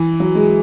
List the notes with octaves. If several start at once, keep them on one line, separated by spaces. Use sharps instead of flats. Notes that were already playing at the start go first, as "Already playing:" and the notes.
Already playing: E3
F#3
G#3